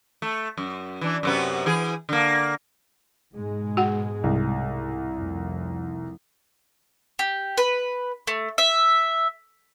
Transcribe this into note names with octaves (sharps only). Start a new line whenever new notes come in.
A3
F#2
E3 D4
F#2 C3 B3
E3 G#4
D3 A#3
G#2 B2 G#3
F#4 F#5
C2
F1
G4
B4
A3
E5